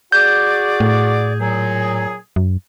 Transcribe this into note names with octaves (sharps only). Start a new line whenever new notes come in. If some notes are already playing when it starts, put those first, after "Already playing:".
F#4 G#4 D5 G6
A2
A#2 F#3 G#4
F#2